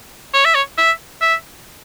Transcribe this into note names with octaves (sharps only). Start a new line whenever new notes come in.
C#5
E5
C#5
E5
E5